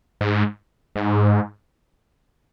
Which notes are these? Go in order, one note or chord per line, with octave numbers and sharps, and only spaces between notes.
G#2
G#2